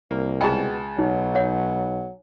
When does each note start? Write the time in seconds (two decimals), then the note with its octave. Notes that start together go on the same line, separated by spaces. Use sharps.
0.11 C2 A#3
0.41 C#2 B2 G#4 D#5 G5 A5
0.99 B1 F#3 D#4
1.35 C#5 F#5